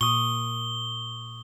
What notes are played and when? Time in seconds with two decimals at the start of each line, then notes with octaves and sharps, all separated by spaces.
0.01 A#2 C#6 D#6 G7